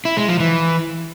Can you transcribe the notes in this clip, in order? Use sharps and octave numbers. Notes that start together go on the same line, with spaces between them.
E4
G#3
F3
E3